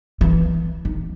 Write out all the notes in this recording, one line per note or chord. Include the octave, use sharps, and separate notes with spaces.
E3
D#3